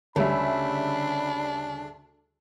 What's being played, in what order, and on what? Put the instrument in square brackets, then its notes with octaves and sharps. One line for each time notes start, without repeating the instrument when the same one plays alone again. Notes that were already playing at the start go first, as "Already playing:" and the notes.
[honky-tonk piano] D2 G3 E5 [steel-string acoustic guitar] C#3 [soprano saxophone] D4 [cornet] B5